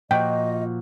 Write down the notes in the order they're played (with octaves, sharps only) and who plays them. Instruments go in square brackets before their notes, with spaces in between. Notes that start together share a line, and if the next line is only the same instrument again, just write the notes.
[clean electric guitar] A#2 F3 F#4 [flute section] D#5 [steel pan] G5